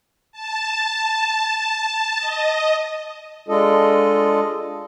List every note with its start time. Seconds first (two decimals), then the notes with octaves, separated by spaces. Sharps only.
0.32 A5
2.18 D#5
3.49 G#3 D4 F4 A4 D#5